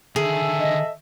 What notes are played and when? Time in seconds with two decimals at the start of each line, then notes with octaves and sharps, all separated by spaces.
0.16 D3 D#3 G#4 A4 E5
0.58 D#5